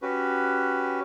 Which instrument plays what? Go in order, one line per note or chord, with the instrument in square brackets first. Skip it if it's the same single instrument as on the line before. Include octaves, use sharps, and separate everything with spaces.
[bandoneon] C#4 F#4 G4 B4